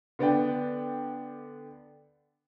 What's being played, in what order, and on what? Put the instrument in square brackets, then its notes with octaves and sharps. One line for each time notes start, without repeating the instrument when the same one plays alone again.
[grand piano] D3 B3 D5 G5